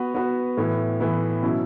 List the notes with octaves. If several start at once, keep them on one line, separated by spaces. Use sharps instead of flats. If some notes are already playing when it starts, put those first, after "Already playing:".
Already playing: B3 F#4 B4
B3 F#4 B4
A2 E3 B3 E4
A2 E3 B3 E4
B2 F#3 C#4 E4